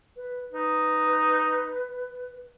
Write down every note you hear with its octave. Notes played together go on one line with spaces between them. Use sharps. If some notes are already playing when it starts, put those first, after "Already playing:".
B4
D#4 B4